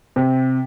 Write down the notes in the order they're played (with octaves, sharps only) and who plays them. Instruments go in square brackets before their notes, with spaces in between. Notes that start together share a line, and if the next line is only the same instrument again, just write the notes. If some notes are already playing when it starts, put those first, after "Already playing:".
[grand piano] C3